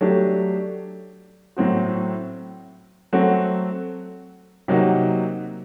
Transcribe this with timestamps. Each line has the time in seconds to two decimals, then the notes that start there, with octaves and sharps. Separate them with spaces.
0.01 F#3 A3 D4 G4
1.56 A2 F#3 C4 F#4
3.13 F#3 A3 C4 F#4
4.68 C3 F#3 A#3 D#4 F#4